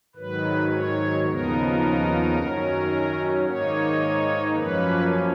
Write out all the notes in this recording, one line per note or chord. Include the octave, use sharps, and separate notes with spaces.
G#2 D#3 F#3 B4
C#5
D#2 C#3 F3 B3 D#4 A#4
F#2 D#3 F#3 C#4
G#2 D#3 A#3 D#4 C#5
F#2 F3 A#3 C#4 B4